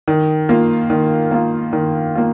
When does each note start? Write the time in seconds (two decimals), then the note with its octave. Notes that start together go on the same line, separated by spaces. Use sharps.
0.08 D#3
0.49 A#3 F4
0.90 D#3
1.31 A#3 F4
1.73 D#3
2.15 A#3 F4